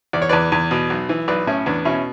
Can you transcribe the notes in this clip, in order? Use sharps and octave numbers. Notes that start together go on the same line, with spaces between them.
E2 D5
C#5
E2 B4 D5
E2
B2
B1
E3
B1 B4 D5
A2 C#4 E4
E2 B3 D4
B2 C#4 E4